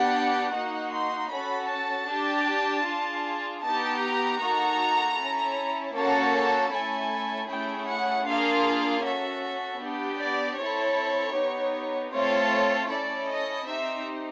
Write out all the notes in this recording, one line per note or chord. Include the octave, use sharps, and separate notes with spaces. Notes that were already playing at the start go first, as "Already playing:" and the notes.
Already playing: B3 D4 G4 F#5
A#3 D#4 F#4 F#5
C6
C#4 F#4 A4 B5
A5
D4 G4
D4 F4 G#4
B3 D#4 G4 A5
A#5
A#3 D#4 F#4 A4
C#4 E4 A4
A#3 C#4 F#4 A4 A5
A5
A3 C#4 E4 A4 G#5
A3 C#4 E4 G#4 G5
F#5
A#3 D4 F4 G#4 F5
C#4 F#4 A4 E5
B3 D4 G4
D5
C4 E4 A4 C#5
B3 D#4 G4
A3 C4 F4 A4 C#5
C#5
C#4 E4 A4 D5
D#5
C4 D#4 G4 E5